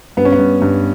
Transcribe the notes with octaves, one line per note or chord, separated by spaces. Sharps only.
G2 B3
C#4
B3
G2
G2